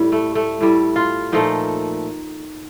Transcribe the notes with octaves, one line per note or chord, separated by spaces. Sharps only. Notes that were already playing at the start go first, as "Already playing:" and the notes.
Already playing: A2 G3
A3
A3
A2 G3
F4
A#2 F3 A3 D#4